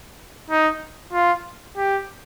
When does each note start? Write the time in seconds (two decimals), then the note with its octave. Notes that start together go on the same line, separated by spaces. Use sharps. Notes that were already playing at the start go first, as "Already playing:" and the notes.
0.50 D#4
1.13 F4
1.77 G4